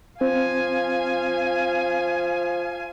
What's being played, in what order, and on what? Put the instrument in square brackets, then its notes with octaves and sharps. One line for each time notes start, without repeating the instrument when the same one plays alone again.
[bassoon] F3 [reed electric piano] C4 [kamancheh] F5 G#5